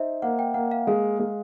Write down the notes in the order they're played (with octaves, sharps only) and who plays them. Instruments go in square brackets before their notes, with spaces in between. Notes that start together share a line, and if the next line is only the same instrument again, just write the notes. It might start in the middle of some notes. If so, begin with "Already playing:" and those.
Already playing: [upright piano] D#4 C5 [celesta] D#5 E5
[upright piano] A#3 [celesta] F#5
[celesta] G5
[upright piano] A#3 [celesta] F#5
[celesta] F5
[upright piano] G#3 [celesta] F5
[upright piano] G#3